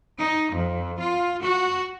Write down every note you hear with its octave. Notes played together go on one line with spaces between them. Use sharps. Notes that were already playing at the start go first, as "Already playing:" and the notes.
D#4
F2
F4
F#4